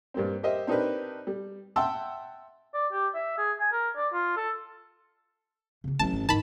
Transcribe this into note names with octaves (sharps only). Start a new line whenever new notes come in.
G2 G3 A#3 C4
G4 A#4 C5 D#5 E5
C4 D4 D#4 G4 A#4 B4
G3
E5 F#5 G5 A5 C6 E6
D5
G4
E5
G#4
G#5
A#4
D5
F4
A4
C#3 A#3
A1 F#3 C#4 A5
G1
G#2 D#3 E3 A5 B5